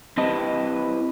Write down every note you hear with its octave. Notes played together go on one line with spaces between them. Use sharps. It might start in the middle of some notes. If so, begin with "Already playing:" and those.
C4 E4 G4 B4 D#5 A5